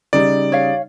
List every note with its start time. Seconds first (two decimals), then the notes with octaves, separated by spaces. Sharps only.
0.13 C#3 G3 D#4 D5
0.52 C#5 F5